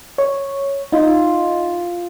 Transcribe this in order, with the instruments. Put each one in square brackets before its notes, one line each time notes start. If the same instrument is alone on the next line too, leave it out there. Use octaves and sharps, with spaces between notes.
[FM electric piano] C#5
[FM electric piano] D#4 [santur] F4